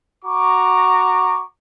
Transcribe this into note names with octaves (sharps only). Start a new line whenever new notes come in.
F#4 A#5 C#6 D6